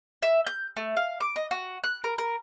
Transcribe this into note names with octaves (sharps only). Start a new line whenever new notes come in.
E5
G6
A3
F5
D6
D#5
F#4
F#6
A#4
A#4